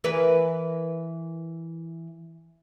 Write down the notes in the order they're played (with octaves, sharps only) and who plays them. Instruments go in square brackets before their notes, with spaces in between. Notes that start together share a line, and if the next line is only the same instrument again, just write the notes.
[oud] E3 A#4 B4